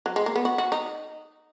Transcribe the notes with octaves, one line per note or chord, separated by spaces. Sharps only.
F#3
G#3
A#3
B3
F#4
F#4
D#4